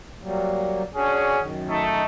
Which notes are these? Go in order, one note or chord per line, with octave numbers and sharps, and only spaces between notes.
F#3 G3 A#3
C#4 D4 F#4 G#4
F#2 D#3
A3 D#4